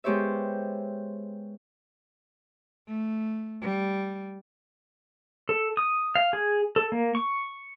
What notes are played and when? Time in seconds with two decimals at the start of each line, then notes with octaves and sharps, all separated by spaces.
0.04 G#3 B3 G4 C5 C#5 E5
2.88 A3
3.62 G3
5.49 A4
5.77 D#6
6.15 F5
6.33 G#4
6.76 A4
6.92 A#3
7.15 C#6